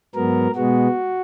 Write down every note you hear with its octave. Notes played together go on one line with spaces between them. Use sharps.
G#2 F#3 B3 A#4
B2 G#3 B3 F#4